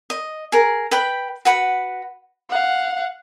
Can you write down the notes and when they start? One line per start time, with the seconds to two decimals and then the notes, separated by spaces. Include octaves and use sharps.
0.10 D#5
0.52 G#4 A#4
0.91 B4 G5 B5
1.45 F#4 B4 F#5 B5
2.49 F5 F#5